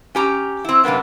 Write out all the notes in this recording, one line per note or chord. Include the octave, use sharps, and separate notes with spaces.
C#4 G4 A#5
C4 E4
F#2 C3 A#3 B3 D4